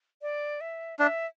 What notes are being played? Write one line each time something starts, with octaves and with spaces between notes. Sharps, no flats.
D5
E5
D4 E5